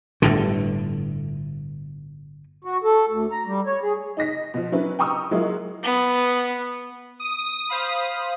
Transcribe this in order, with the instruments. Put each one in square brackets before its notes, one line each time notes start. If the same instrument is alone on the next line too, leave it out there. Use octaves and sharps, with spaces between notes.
[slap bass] G1 A2 D3
[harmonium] F#4
A4
D2
A#5
G3
C#5
G#4
[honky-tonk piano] D#4 D#5 A#6 B6
B2 F3
F#3 C#4 D4 E4 B4
G5 A#5 C#6 D#6 E6
F#3 G#3 A#3 E4 F4
[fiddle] B3
[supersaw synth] D#6
[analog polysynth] C5 F5 B5